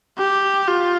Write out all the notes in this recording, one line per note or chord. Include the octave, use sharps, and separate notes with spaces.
G4
F4